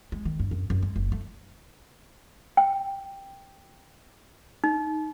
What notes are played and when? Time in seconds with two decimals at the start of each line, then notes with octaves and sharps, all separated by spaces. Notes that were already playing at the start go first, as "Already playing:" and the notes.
0.12 G#3
0.25 D#3
0.40 G2
0.51 F#2
0.70 F#2
0.83 G#3
0.96 F#1
1.12 A3
2.57 G5
4.64 D#4